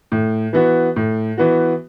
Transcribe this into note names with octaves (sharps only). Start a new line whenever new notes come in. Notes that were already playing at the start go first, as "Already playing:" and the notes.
A2
E3 B3 F#4
A2
E3 B3 F#4